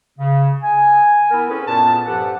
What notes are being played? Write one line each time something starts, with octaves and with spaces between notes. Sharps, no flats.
C#3
G#5
B3 E4 A#4
C4 C#4 E4 G#4 A4 B4
F#2 A#2 B3 F4 A5
G2 F3 G4 A4 B4 F#5